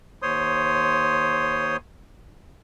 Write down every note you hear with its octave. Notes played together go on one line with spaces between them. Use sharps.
D#2 C5 C#5 C6 D#6